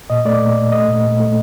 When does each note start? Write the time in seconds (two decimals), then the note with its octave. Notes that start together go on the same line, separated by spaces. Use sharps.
0.10 A#2 D#5
0.25 A3 D5
0.42 A#2
0.57 A#2
0.72 A3 D#5
0.88 A#2
1.04 A#2
1.20 A3